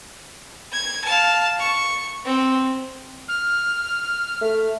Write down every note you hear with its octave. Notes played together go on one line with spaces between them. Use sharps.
G#6
F5 A5
C#6
C4
F6
A3